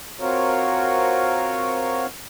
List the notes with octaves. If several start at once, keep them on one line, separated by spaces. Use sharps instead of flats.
C4 F4 F#4 A#4 C#5